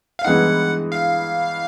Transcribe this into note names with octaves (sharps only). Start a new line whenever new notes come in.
F5
G2 E3 G#3 B3 D#4 F#5
F5